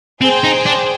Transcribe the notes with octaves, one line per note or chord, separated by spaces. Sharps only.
C4 G#4 C5 G5
D#4
D4